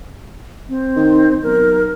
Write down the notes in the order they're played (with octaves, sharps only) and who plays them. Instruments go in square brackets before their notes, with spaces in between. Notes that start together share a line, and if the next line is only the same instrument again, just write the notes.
[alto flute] C4
[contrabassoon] D#3
[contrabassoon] B1 [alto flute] A#4